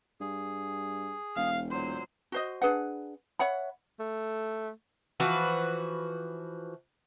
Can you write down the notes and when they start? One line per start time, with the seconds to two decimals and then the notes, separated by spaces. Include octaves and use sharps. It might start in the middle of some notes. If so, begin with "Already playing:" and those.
0.20 G2 G#4
1.36 E1 F5
1.71 A#2 F#3 C5
2.32 F#4 C5 D#5
2.62 D4 G#4 B4 F#5
3.39 C#5 E5 F#5 B5
4.00 A3
5.20 E3 F3 F#4 B4